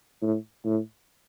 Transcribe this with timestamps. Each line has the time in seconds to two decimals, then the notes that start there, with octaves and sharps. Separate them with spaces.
0.22 A2
0.65 A2